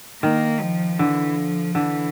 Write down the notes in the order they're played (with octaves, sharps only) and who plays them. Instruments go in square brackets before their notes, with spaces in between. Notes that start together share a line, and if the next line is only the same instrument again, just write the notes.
[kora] D#3 [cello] A#3
[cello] F3
[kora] D3 [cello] E3
[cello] F3
[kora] D3 [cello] E3